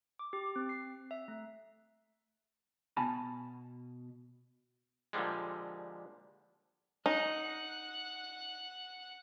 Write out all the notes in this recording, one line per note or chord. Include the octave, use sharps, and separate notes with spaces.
D6
G4
C4
C7
E5
A3
B2 G#5 A5 B5
A#2 D3 F3 G3 G#3
D#4 F#5 F#6